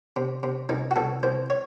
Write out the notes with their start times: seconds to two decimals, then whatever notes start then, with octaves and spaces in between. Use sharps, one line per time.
0.16 C3
0.43 C3
0.69 C2 D#4
0.91 F#4
0.96 C2 A4
1.23 C2 C5
1.50 C#5